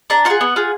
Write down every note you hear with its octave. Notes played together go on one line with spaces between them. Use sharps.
D4 A#5
F4 G#4 F#5
B3
F4 G#4